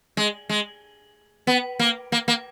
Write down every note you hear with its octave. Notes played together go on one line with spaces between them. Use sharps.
G#3
G#3
B3
A#3
A#3
A#3